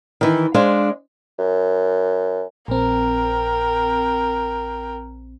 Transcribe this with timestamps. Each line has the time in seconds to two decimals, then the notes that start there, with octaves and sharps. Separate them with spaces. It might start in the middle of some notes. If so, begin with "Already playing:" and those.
0.21 D#3 E3
0.54 G#3 D4 C5 F5
1.39 F#2
2.68 A#1 C4 A#4 G5